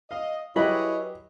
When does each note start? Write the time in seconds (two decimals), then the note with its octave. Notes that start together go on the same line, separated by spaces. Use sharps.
0.11 D#5 F5
0.56 F#3 E4 G4 G#4 B4 C#5 D#5 B5